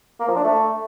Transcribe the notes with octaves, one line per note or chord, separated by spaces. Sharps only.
A#3
F3
D4
A3